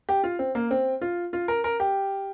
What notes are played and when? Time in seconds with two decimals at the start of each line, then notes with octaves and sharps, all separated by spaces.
0.09 G4
0.24 F4
0.39 C4
0.55 A#3
0.71 C4
1.01 F4
1.33 F4
1.48 A#4
1.64 A#4
1.80 G4